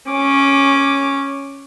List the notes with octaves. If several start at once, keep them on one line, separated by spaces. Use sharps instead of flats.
C#4 D6